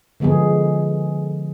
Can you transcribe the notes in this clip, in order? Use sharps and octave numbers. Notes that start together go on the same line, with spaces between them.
D3 F3 G#3 B3 G#4